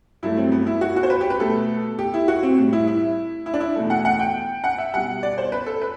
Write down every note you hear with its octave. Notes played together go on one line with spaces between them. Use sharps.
G2 F#3 A3 E4
C4
B3
E4
F#4
F#4
C5
B4
G4
B4
B2 A3 A4
G4
E4
F#4
C4
A2 G3
E4
E4
E4
D4
E4
E2 B2 A3
F#5
F#5
G5
F#5
E5
B2 G3 F#5
D5
C5
B4
A4
B4